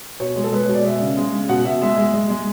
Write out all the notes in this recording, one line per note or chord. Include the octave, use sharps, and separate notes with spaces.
B2 C#5
G#3
A4
G#3 B4
B2 C#5
D5
G#3 E5
C#3
G#3
C#3
B2 F#5
B2 E5
G#3 E5
G#3
G#3
G#3